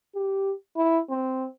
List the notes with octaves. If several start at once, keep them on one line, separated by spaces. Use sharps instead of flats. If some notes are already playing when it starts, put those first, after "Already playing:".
G4
E4
C4